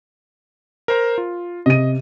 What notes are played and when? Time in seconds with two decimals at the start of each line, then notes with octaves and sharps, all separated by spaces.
0.88 A#4 C5 A#5
1.18 F4
1.66 C3 D#5 D#7